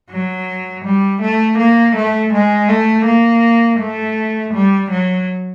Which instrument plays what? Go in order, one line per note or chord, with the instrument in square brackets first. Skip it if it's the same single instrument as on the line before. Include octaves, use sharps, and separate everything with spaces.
[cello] F#3
G3
A3
A#3
A3
G#3
A3
A#3
A3
G3
F#3